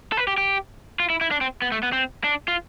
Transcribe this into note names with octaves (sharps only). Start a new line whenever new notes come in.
A4
B4
G4
G4
F4
E4
E4
D4
C4
B3
A3
B3
C4
D4
F4